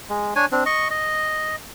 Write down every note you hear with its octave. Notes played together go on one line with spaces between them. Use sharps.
G#3
D4 C#5 G#5
C4 D4
D#5 C#6
D#5